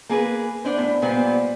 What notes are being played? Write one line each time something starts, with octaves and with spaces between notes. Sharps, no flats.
A#3 G#4 A#4 B4
B3 D4 C5
A2
A#2 G3 B3 C5